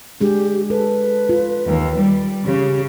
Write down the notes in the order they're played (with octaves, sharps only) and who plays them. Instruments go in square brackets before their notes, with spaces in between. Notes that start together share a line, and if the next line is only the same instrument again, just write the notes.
[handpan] G#3 D4 G#4 [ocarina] G4
[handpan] A4 [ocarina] B4
[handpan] F4
[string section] D#2
G3
[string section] C#3 [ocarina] G4